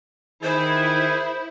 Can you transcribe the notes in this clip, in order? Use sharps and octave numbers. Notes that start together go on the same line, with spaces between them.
D#3 E3 E4 G#4 C5